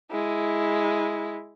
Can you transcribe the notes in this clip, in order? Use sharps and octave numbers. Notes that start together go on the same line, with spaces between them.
G#3 E4